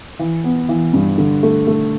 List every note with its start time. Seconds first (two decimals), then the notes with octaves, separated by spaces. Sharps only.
0.19 E3
0.44 B3
0.69 E3
0.93 G2
1.18 D3
1.43 A3
1.67 A3